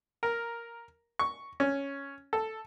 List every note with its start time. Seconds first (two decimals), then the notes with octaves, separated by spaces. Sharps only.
0.23 A#4
1.19 C#6
1.60 C#4
2.33 A4